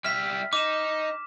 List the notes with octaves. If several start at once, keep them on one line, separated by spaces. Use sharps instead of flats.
G3 E5 F6 B6
D#4 D6 E7